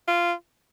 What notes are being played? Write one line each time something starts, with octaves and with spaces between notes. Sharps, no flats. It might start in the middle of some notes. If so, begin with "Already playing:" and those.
F4